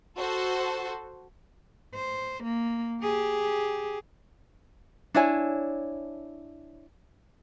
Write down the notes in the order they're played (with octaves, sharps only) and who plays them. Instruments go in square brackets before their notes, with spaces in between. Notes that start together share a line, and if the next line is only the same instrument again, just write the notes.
[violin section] F#4 A4 C5
[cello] C5
A#3
G4 G#4
[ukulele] D4 E4 C#5 G#5